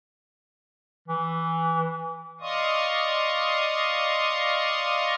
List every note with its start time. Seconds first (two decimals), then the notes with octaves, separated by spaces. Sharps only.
1.08 E3
2.41 D5 D#5 F5 C6 C#6 D#6